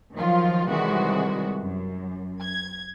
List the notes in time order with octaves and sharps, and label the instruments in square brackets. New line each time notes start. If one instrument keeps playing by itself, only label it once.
[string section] D#3 F3 F#3 F4
C3 D#3 E3 G3 G#3 F#4
F#2
G#6